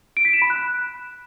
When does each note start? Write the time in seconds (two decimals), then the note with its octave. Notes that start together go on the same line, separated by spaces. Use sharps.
0.17 D7
0.25 B6
0.33 E7
0.42 B5
0.50 F#6